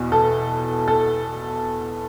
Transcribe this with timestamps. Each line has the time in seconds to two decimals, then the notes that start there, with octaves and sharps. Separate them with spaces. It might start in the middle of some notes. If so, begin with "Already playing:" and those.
Already playing: E2 B2
0.12 A4
0.88 A4